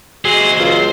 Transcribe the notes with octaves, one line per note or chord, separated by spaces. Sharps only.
F#3 G#3 G#4 C5
C#2 F4